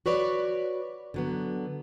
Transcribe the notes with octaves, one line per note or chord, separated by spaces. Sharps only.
F#4 B4 C#5 D5
D3 F#3 B3